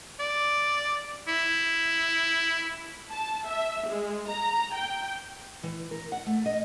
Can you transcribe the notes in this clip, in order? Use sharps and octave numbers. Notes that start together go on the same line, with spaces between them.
D5
E4
A5
E5
G#3
A#5
G5
E3
A#4
F#5
A3
D#5